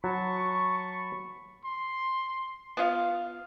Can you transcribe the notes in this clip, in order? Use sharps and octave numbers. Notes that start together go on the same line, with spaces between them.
F#3 A5 B5 C#6
C6
B3 F4 F5